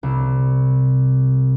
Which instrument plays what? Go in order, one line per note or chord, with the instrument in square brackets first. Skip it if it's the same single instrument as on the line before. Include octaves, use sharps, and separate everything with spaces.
[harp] C2